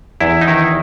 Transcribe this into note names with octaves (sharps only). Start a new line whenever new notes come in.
E2 E4
D#4
D#3 E4